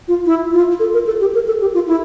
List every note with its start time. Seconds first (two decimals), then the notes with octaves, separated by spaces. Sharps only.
0.08 F4
0.26 E4
0.53 F4
0.80 A4
0.94 A#4
1.06 A4
1.21 G4
1.34 A#4
1.47 A4
1.61 G4
1.74 F4
1.87 E4